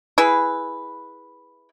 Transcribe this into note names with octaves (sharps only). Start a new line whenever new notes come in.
E4 G#4 B4